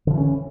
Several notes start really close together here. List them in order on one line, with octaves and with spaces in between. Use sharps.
D3 F3 E3 C#4